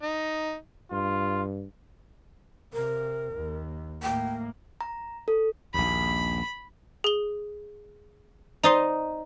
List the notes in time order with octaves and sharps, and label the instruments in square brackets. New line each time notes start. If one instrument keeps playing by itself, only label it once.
[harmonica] D#4
[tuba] G2 [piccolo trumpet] F4
[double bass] C3 [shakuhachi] A#4
[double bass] D#2
[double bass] A2 A#3 [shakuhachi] G5
[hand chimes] A#5
A4
[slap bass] A#1 D#2 [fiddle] B5
[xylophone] G#4 G7
[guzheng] D#4 D#5 C6 [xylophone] C5 D5 A#5